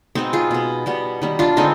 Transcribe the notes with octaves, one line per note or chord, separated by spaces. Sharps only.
B2 G#3 B3 C4 D#4
F4 G#4
B2 B3
B2 G3 B3
D#3 G3 B3
D4 F4
D3 G#3 B3 C4 D#4